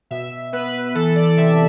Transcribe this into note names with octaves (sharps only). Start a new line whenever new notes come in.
B2 E5
B3 B4
E3 A4
D5
C3 E5